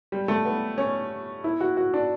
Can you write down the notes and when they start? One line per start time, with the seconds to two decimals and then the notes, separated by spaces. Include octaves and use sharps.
0.12 G3
0.28 A3
0.45 B3
0.78 C#4
1.44 E4
1.60 F#4
1.77 F#4
1.94 D4